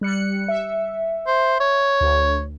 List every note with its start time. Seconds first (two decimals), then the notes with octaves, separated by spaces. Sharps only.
0.01 G3 F#6 C#7
0.48 E5
1.27 C5
1.60 C#5
2.01 D2